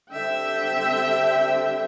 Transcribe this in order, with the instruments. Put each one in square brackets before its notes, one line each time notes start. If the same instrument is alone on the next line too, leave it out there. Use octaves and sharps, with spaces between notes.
[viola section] D3 G3 C4 E5 G5